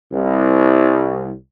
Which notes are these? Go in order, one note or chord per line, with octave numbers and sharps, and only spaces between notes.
C2